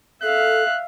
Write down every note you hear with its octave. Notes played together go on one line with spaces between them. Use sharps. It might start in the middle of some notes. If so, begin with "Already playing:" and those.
A4 E5 F5 F#6